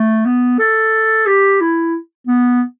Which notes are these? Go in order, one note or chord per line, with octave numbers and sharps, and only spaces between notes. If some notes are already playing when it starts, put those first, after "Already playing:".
Already playing: A3
B3
A4
G4
E4
B3